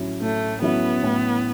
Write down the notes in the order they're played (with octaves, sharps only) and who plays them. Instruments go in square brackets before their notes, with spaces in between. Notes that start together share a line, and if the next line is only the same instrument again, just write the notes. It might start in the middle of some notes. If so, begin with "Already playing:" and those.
Already playing: [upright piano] A2 F#3 C#4 E4
[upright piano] A2 [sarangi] A3
[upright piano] F#3 C#4 E4 [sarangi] B3
[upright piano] A2